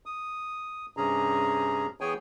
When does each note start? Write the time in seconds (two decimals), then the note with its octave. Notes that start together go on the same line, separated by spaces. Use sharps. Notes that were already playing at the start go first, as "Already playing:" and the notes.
0.06 D#6
0.97 G2 C3 C#4 G#4 A#5
2.01 E3 B3 G#4 C#5 G5 G#5